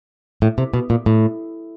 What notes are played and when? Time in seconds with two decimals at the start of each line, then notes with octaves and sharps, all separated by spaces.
0.42 A2
0.58 C3
0.74 B2
0.90 A#2
1.06 A2